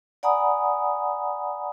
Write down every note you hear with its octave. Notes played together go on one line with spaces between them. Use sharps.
D5 F#5 G#5 A#5 B5 D#6